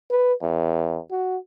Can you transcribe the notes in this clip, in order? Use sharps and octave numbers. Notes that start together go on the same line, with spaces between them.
B4
E2
F#4